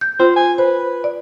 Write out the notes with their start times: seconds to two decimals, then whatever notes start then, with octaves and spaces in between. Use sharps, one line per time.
0.01 G6
0.20 F4 C5
0.36 G#5
0.58 B4 C5
1.04 D5